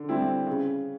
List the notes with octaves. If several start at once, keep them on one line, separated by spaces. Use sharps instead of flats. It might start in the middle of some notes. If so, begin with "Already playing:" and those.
Already playing: D3
G3 C4 E4
C#3